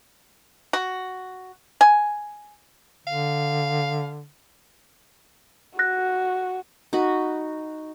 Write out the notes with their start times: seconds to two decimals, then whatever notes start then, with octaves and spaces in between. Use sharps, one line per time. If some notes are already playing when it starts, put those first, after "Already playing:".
0.73 F#4
1.81 G#5
3.07 D3 F5
5.79 F#4 F#6 A#6
6.93 D#4 F#4 B5